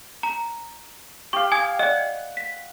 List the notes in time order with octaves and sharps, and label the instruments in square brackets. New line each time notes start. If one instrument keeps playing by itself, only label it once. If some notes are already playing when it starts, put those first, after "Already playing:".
[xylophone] A#5
[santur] G4 F5 [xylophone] C#6
[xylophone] G#5 D#6 G#6
[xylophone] D5 D#5 [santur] F#5
[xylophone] B6